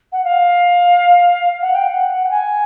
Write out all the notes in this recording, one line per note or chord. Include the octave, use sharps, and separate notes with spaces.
F#5
F5
F#5
G5
F#5
G5
G#5